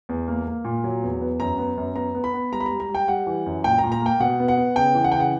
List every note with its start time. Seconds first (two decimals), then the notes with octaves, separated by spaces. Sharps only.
0.09 E2
0.28 A#3
0.47 A#3
0.65 A#2
0.84 F#3
1.03 E2
1.21 B3
1.40 F#2 A#5
1.58 B3
1.78 F#2
1.95 B3 A#5
2.15 B3
2.24 B5
2.34 B3
2.52 G3 A#5
2.60 B5
2.66 A#5
2.71 G3
2.80 A#5
2.89 G3
2.95 G5
3.08 G3 F#5
3.27 E3
3.46 F#2
3.64 A#2 G5
3.78 A#5
3.83 A#2
3.92 A#5
4.02 A#3 G5
4.20 B2 F#5
4.40 B3
4.48 F#5
4.57 B3
4.76 C#3 G5
4.95 E3
5.04 F#5
5.12 G5
5.15 C#3
5.20 F#5